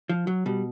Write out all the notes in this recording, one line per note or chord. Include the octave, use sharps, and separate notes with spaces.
F3
F#3
B2 G3